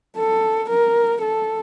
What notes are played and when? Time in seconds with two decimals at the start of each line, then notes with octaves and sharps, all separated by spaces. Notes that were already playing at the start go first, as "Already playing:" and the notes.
0.17 A4
0.70 A#4
1.23 A4